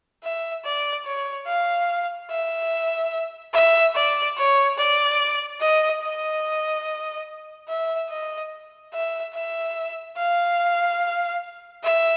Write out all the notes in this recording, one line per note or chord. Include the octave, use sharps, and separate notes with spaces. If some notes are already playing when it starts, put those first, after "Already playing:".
E5
D5
C#5
F5
E5
E5
D5
C#5
D5
D#5
D#5
E5
D#5
E5
E5
F5
E5